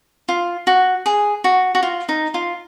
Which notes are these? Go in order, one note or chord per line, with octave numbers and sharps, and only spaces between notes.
F4
F#4
G#4
F#4
F#4
F4
D#4
F4